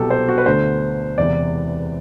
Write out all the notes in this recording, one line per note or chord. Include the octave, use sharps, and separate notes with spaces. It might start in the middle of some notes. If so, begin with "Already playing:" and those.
Already playing: C2 B2 F#3 G4 A4
C5
F#4
B4
D2 D3 A3 C5
E1 E2 C3 E3 D5